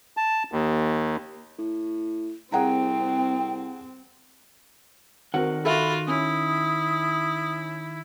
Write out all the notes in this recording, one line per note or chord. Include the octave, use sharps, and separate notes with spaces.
A5
D#2
A2
C2 C4 G#4 F#5 G5 A#5
D#3 C4 F#4 A#4 F#5
F4 F#4 A4 E5 B5
C#4 E4 D#6